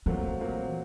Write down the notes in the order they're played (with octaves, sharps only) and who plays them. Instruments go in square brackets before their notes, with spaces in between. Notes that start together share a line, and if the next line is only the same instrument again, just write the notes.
[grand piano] A#2 F#3 A3 C4 F4 [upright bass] E3
[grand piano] A#2 F#3 A3 C4 F4